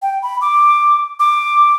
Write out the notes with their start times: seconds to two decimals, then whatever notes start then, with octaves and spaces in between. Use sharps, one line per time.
0.02 G5
0.23 B5
0.41 D6
1.20 D6